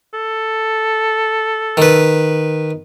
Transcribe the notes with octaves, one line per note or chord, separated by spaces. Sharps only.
A4
D#3 B4